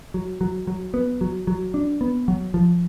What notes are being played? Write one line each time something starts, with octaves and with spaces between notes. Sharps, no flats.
F#3
F#3
F#3
B3
F#3
F#3
D4
B3
F#3
F3